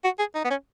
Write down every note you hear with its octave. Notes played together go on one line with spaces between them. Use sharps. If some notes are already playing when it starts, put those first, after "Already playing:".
F#4
G#4
D#4
B3
C#4